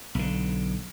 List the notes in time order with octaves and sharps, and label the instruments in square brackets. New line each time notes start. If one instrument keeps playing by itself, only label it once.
[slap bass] B1 D3